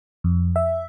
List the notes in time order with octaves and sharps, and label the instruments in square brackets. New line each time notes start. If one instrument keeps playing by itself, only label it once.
[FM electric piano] F2
E5